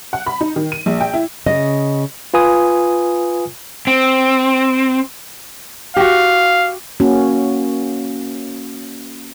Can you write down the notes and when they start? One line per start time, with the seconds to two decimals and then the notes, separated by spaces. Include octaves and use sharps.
0.13 F#5
0.26 B5
0.41 D#4
0.56 D#3
0.72 D#7
0.86 A#1
1.00 G5
1.14 E4
1.46 C#3 D#5
2.34 F4 B4 G#5 D#6
3.87 C4
5.97 F#4 G4 F5
7.00 A#3 C#4 F#4